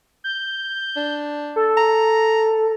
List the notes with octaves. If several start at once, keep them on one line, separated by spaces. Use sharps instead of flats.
G6
D4
A4
A#5